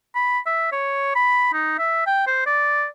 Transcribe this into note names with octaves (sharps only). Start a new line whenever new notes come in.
B5
E5
C#5
B5
D#4
E5
G5
C5
D5